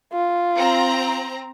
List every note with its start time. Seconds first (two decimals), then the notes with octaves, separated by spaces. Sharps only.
0.13 F4
0.56 C4 A#5